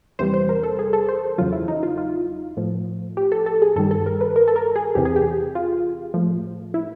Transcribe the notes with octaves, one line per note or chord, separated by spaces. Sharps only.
E2 C3 E3 G3 C5
C5
A#4
A4
G#4
A4
C5
E2 C#3 F#3 F4
E4
D#4
F4
F4
A2 F3
G4
A4
A4
G#4
G2 D#3 G3 A4
A4
A#4
B4
A#4
A4
A#4
G#4
E2 C3 E3 G4
G#4
G4
F4
A2 F3
E4